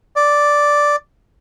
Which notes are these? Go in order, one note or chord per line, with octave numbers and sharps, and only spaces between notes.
D5